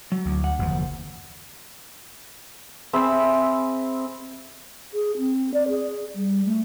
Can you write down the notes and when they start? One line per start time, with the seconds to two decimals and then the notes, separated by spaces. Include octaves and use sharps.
0.12 F#3
0.26 D2
0.44 F#5
0.59 F#1 D#2 F3
2.93 C4 G#4 E5 B5
4.94 G#4
5.18 C4
5.54 D5
5.69 G#4
6.15 G3
6.46 A3